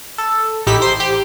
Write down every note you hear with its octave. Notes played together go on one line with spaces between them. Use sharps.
A4
A1 D#4 E4 G4 B6
C5 C6
G4